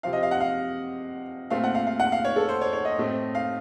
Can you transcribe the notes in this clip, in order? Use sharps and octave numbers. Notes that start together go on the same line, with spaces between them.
C3 F3 C4 F5
D#5
F5
F#5
F5
A#2 A3 C4 F5
F#5
F5
F5
F#5
F5
C#5
A4
C5
C#5
C#5
D#5
A2 A3 C4
F5